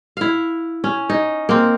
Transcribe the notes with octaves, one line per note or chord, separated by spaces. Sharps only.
E4 F5
C#4
D#4
A#3 C4